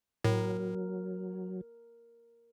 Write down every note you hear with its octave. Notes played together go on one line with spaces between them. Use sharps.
A2 F#3 A#4